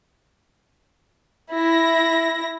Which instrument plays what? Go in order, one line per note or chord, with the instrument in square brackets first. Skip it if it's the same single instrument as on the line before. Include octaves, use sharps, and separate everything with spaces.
[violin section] E4 A#6